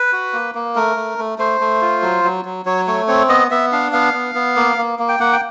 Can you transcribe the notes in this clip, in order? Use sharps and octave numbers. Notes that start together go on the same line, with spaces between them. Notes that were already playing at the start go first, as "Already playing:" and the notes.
Already playing: B4
F#4
A#3
A#3
A3 A#4
A3
A3
A3 C5
A3
F4
F#3
F#3
F#3
F#3 C#5
A3 C#5
C4 C#5
B3 D#5
B3 E5
D4 F5
B3 F5
B3
B3
A#3
A#3
A#3
G5
A#3 F#5
G5